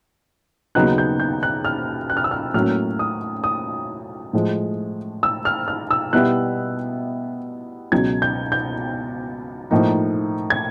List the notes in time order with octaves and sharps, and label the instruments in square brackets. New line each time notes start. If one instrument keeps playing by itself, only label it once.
[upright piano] D#2 C#3 F#3 B3 D#4 F#6
G6
G6
F#6
F6
F#6
F6
E6
F6
A2 F#3 A#3 C#4 F6
D#6
D#6
A2 F3 G#3
E6
F6
F6
E6
B2 G3 B3 E4 F#6
C#2 B2 F#3 G#6
G6
G6
A2 F3 A#3 D#4
G#6